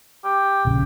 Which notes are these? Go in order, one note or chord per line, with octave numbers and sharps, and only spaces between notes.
G4
D#1 A#1 C#3